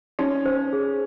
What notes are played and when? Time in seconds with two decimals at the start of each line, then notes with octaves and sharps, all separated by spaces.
0.19 C#4 D#4
0.46 C5
0.73 G#4